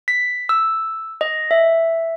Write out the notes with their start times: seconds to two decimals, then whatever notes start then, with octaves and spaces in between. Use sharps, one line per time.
0.08 B6
0.49 E6
1.21 D#5
1.51 E5